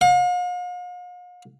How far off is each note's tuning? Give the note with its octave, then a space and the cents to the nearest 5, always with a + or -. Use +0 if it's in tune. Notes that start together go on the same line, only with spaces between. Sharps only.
F5 +45